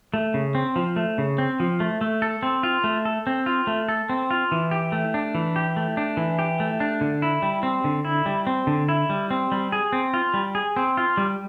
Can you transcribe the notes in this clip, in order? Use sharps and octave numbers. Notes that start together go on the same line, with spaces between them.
A3
C#3
C4
F3
A3
C#3
C4
F3
A3
A3
A4
C4
F4
A3
A4
C4
F4
A3
A4
C4
F4
E3
G4
A3
D4
E3
G4
A3
D4
E3
G4
A3
D4
D3
E4
G3
C4
D3
E4
G3
C4
D3
E4
G3
C4
G3
G#4
C4
F4
G3
G#4
C4
F4
G3